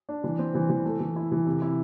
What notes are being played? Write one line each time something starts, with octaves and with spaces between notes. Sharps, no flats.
D4
E3
C4
E3
E3
A3
E3
E4
E3
C3
E4